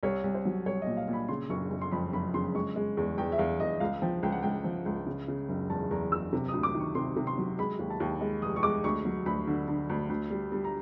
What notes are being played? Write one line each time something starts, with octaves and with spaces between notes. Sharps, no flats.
C2 C#5
C2
C5
F#3
C2 C#5
A#2 D#5
F5
A#2
B5
C#3 C6
F#1 C#6
F#1
C6
F2 B5
F#1 B5
C#3 C6
G#3 C#6
G#3
E2
E2 G5
E5
E2 F5
E2 D#5
C#2 F5
F3 G5
C#2 G5
F#5
C#2 G5
F3
C#2
C#3
C#3
F#1
E2 A5
E2 A#5
F#1 E6
C3
D2 D#6
D6
D#3
C#6
C3 C6
C3
C6
F#3
G#3 B5
D#2
A5
D#2
G#3
F1 D#6
C#6
G#3 D6
D2 C#6
F#3
D2 B5
D3
D3
D2
D2
G3
G3
A#5